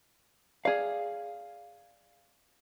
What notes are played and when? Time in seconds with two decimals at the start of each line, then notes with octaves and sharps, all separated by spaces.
0.65 G#4 D5 F5